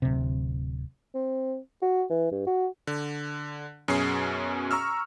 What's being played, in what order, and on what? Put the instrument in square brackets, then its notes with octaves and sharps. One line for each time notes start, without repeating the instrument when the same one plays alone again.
[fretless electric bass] D1 C3
[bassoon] C4
F#4
E3
G2
F#4
[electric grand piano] D3
F#2 B2 C#4 G#4 C7
A#5 C#6 E6 F6